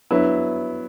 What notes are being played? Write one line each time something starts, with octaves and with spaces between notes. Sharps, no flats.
G2 F#3 B3 E4 B4